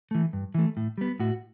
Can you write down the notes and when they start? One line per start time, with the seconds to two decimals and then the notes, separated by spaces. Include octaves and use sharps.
0.11 E3 A3
0.33 G2
0.55 E3 A3
0.77 A2
0.98 G3 B3
1.20 A2 F#4